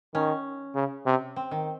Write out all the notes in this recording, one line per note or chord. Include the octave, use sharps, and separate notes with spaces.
D#3 C#4
C#3
C3
C4
D#3